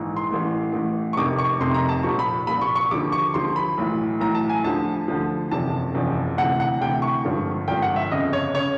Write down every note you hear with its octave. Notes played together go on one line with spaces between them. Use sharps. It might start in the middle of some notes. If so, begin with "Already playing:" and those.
Already playing: A#1 G#2 E3
C6
A1 A2 E3
A1 A2 E3
C#6
F1 F2 C3 D#3 D6
C#6
F1 F2 C3 D#3 C6
A#5
A5
C2 A#2 F3 C#6
B5
C2 A#2 F3 B5
C#6
C#6
D#2 D3 F3 D6
C#6
D#2 D3 F3 C6
B5
B1 A2 E3
B1 A2 E3 A#5
A5
G#5
D2 D3 F3 A5
D2 D3 F3
F#1 E2 C3 F3 A5
F#1 E2 C3 F3
D2 C3 E3 F#5
F#5
D2 C3 E3 G5
C#6
G#1 G2 D3 F3
G#1 G2 D3 F3 G5
F#5
E5
G1 F2 C#3 D#5
C#5
C#3 C#5